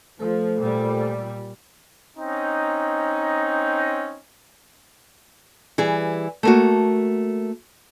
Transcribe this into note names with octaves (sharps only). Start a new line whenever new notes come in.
F3 A3 A4 C5
A#2 G3
C4 C#4 D#4
E3 G3 G#4
A3 A#3 F#4